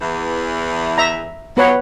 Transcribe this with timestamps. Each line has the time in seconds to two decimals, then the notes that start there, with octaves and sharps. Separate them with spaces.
0.01 E2 E3
0.98 E5 A#5
1.57 B2 F3 F#3 B3 B4 C#5